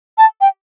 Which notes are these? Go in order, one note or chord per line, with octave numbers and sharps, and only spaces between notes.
A5
G5